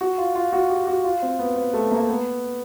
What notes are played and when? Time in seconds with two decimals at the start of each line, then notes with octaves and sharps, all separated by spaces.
0.01 F#4
0.18 F4
0.35 F4
0.53 F#4
0.70 G4
0.87 F#4
1.04 F4
1.22 C4
1.39 B3
1.56 B3
1.73 A3
1.92 A#3
2.09 B3